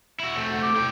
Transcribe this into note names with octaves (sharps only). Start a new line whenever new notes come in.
E4 F#4 E5
A3 C4
F#4
D6
E4 G5